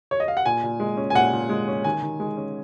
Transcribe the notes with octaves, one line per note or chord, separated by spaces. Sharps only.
C#5
D#5
F5
F#5
A#2 G#5
A#2
G#3
C#4
G#5
A#2 F#5
A#2
G#3
C#4
D#3 G#5
D#3
G#3
C#4